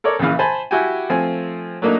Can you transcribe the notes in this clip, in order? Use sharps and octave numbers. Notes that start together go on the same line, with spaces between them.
A4 A#4 C#5 D5
A#1 A#2 C#3 E3 F5
C5 G#5 A5 B5
E4 F#4 G4 G5 G#5
F3 A3 C4 G#5
F#3 A3 A#3 D4 D#4